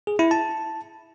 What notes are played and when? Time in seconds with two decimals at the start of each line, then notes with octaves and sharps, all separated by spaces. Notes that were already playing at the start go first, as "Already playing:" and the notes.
0.07 G#4
0.19 E4
0.31 A5